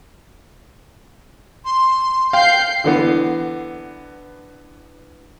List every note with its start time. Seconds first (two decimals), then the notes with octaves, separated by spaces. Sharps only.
1.65 C6
2.33 F5 G5 G6 C7
2.84 D3 E3 B3